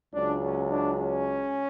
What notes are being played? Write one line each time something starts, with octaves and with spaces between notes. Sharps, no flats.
C#2 C#3 F#3 D4
C#4
D4
C#4